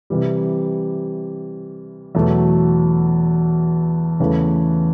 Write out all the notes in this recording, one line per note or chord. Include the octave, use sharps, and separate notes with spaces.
C3 E3 G3
E2 B2 F#3 A3
E2 C#3 E3 A3